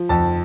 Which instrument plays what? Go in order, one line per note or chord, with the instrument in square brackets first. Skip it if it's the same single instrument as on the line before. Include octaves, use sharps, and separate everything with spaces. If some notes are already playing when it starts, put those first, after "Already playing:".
Already playing: [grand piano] F3
F2 A5